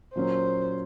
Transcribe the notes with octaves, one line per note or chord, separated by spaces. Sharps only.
A#2 F#3 A#3 C#4 C5